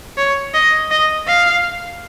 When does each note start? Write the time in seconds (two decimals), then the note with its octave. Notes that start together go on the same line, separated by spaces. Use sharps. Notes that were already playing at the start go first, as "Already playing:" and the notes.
0.18 C#5
0.54 D#5
0.91 D#5
1.28 F5